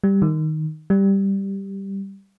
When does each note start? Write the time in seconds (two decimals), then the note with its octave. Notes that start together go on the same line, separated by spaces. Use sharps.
0.04 G3
0.22 D#3
0.90 G3